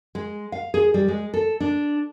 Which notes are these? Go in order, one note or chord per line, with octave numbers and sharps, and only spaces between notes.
G#3
F5
G#4
G3
G#3
A4
D4